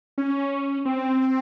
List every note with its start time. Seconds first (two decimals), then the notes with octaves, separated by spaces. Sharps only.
0.18 C#4
0.85 C4